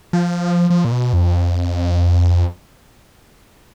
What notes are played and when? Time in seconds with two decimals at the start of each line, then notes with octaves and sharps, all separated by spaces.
0.13 F3
0.70 F3
0.85 A#2
0.92 B2
1.13 F2